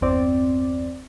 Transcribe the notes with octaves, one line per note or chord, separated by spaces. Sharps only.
G1 E2 C4 D5